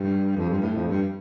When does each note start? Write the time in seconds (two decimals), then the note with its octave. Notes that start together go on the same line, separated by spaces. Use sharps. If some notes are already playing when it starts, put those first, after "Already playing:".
Already playing: G2
0.37 F2
0.50 G2
0.62 A2
0.75 F2
0.88 G2